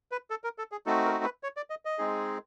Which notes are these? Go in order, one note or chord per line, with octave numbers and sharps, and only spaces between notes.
B4
A4
A#4
A4
G#4
A3 C4 D#4 F#4 A4
A#4
B4
C#5
D5
D#5
D#5
G#3 C4 D#4 G#4